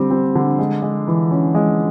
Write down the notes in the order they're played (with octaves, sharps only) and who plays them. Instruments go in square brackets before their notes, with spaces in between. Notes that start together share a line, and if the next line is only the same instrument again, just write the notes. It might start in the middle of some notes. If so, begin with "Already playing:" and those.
Already playing: [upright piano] D3 G3 C4
C4
D3
G#3
G#3
E3
C#4
G#3